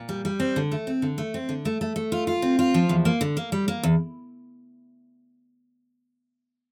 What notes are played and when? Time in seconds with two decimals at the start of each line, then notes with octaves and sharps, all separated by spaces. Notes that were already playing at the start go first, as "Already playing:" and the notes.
Already playing: A#2
0.09 G3
0.25 G3
0.40 C4
0.56 D3
0.72 A3
0.87 C4
1.02 D3
1.18 A3
1.34 C4
1.49 D3
1.65 A3
1.81 A3
1.96 A3
2.12 F4
2.27 F4
2.42 C4
2.59 F4
2.74 F3
2.89 E2
3.05 A#3
3.21 D3
3.37 A#3
3.52 G3
3.68 A#3
3.83 E2